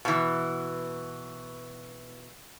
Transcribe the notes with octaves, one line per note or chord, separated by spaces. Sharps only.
B2 E3